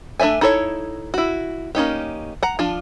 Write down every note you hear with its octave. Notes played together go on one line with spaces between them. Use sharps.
A3 D4 D5 E5 G#5
D#4 E4 A4 C5 C#5
E4 F#4
A#3 C#4 D#4 G4
F#5 A#5
F3 D4 F4